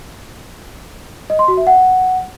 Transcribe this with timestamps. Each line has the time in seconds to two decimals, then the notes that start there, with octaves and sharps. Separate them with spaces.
1.30 D#5
1.39 C6
1.48 F#4
1.57 E5
1.67 F#5